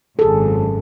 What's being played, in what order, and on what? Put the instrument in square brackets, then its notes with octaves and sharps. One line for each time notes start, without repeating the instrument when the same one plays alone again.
[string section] G#1 C#2 F#2 [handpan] G#4 A4